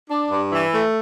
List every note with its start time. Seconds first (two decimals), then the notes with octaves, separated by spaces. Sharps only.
0.10 D4
0.31 G2
0.52 E3
0.74 A3